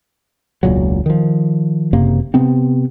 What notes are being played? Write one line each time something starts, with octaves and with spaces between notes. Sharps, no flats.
E1 C#2 A#2 F#3
D#3 F3
F#1 F#2 C3 A#3
C3 B3 C4